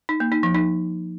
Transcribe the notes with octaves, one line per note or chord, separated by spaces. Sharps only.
D#4
A#3
D#4
F3
D#4